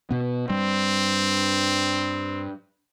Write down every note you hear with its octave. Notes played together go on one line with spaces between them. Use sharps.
B2 B3
G2 G3 C4